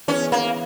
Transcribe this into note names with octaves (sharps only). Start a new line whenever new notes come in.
E3 B3 C#4 E4 G#4
A#3